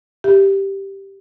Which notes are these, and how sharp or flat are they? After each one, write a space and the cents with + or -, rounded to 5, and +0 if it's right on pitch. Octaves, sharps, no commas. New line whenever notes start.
G4 +0 E5 +0